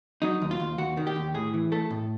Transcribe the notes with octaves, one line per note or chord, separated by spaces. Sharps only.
F#3 D#4
D#2
F4
D#2
D#2 F#4
D#3
G4
D#2
A2 G#4
E3
A3 A4
A2